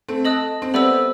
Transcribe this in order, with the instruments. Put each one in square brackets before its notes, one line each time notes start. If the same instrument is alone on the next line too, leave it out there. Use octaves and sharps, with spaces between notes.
[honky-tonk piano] A3 C4
[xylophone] A4 D#5 A5 D#6 F#6
[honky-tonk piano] C4
[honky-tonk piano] G3 B3 [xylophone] A4 C5 E5 B5 E6